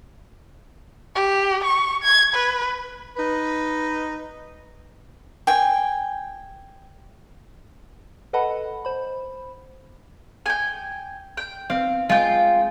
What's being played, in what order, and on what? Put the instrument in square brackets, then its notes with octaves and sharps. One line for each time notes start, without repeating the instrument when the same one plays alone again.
[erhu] G4
C#6
G#6
B4
[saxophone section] D#4 B4
[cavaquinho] G5 G#5
[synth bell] A4 B4 D#5 F#5 A5 B5
C5 B5
[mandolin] G5 G#5
G5
[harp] C4 [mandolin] F5
[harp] G#3 [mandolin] F4 G5